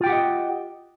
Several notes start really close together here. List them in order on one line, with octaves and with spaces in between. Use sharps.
F4 G5 G4 F#5 D#5